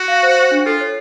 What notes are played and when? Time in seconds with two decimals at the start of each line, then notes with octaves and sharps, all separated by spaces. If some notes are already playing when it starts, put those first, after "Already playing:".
Already playing: F#4
0.08 F5
0.23 C5
0.37 C5
0.51 D4
0.65 F4 A4
0.81 C#5